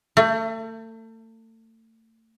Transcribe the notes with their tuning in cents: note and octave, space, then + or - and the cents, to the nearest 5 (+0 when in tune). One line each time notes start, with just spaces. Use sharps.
A3 +35